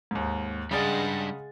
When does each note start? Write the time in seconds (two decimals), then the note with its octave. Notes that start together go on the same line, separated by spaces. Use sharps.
0.11 D#2 G#2
0.71 C#3 G3 G#3 D4 F#5 D#6 A6